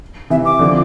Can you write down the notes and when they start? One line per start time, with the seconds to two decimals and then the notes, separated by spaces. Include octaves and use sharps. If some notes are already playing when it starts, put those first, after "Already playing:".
0.30 C3 E3 E5
0.45 D6
0.59 D3 F3